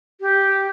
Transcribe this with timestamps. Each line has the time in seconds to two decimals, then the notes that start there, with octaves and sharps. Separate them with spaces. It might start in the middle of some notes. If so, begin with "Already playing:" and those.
0.21 G4